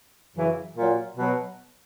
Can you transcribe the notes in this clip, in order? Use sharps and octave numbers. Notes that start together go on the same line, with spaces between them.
F#2 C#3 E3
A#2 F#3
B2 F#3